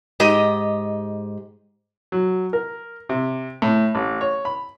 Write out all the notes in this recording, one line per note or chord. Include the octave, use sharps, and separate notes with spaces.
G#2 G4 D#5
F#3
A#4
C3
A2
A1
C#5
B5